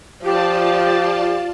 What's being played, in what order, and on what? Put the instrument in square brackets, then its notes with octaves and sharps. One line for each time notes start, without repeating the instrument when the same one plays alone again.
[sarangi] F3 [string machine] F4 D5 A5 [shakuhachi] G4